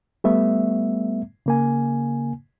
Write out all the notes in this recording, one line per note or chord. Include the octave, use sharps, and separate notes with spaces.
G3 A3 B3 E5
C#3 A#3 G#5